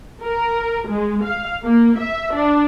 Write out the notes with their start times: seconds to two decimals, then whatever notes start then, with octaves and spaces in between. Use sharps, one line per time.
0.22 A#4
0.88 G#3
1.23 F5
1.64 A#3
1.98 E5
2.33 D4